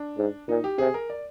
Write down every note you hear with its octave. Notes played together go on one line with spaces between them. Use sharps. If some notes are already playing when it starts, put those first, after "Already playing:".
Already playing: D4
G#2
A#2 D#4
G4
C3 G#4
A#4
D5